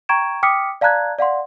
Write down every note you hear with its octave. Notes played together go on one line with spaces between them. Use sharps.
G5 A#5 C#6 G#6 D7 E7
G5 D6 D#6 F6 B6 C#7
D5 F5 A5 A#5 F#6 G#6
D5 F5 F#5 C6